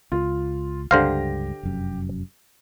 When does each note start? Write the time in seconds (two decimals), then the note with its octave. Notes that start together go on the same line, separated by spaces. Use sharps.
0.12 C#2 F4
0.91 C#2 G2 D3 G4 C5 F5 A#6
1.63 F1 F#2